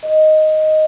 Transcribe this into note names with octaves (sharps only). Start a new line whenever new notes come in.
D#5